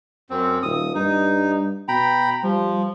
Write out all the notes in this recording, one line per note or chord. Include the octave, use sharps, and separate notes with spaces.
F#2 C4
D#1 D#6
G2 D#4
B2 G5 A#5 B5
F3 G3